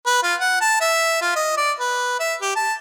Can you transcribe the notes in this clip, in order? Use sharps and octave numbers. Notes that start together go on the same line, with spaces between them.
B4
F4
F#5
A5
E5
F4
D#5
D5
B4
E5
G4
A5